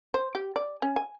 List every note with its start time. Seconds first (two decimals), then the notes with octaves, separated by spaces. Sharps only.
0.14 C5
0.35 G4
0.56 D5
0.82 C#4
0.96 G#5